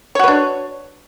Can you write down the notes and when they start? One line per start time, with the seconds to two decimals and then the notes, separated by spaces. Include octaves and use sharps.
0.15 C#5
0.19 F#4
0.24 B4
0.28 D4